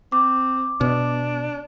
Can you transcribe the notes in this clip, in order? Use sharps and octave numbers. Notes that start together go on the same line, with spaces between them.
C4 D6
B2 D4